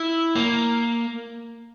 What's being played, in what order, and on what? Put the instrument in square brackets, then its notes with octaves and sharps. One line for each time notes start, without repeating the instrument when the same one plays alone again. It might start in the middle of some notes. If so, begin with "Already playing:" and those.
Already playing: [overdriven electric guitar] E4
A#3